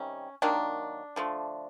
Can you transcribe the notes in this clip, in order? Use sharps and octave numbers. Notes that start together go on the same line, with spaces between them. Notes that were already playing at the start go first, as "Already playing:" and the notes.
Already playing: C3 D#3 G3 C#4
D#3 F#3 A#3 D4
D3 F3 A3